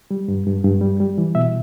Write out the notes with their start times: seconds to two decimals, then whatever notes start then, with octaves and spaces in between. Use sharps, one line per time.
0.11 G3
0.28 G2
0.46 G2
0.64 G2
0.81 G3
1.00 G3
1.18 E3
1.35 B2 E5